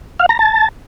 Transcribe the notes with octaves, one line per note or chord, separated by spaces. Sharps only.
F5
A#5
A5